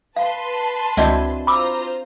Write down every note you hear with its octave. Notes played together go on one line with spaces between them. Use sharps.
B4 F5 A5 C6
C#2 C4 D4 E4 F#4 D#5 F#5 G#6
F4 C5 A#5 B5 D6 E6